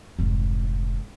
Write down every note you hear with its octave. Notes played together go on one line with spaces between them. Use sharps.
F1 G#2